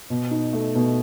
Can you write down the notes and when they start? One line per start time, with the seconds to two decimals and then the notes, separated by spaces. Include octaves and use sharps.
0.10 B2
0.31 D#4
0.53 A3
0.75 B2